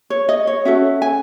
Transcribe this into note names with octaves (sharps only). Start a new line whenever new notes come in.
C#5
D#5
C#5
C#4 F#4 A4 E5
G#5